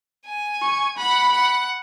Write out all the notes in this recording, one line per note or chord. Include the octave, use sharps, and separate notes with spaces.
G#5
C#6
F#5 B5
F#5